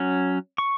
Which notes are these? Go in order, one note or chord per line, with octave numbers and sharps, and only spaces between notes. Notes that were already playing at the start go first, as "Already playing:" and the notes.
Already playing: F#3 C#4
C#6